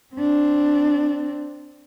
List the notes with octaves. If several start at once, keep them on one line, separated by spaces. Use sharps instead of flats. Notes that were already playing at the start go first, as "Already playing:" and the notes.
C4 D4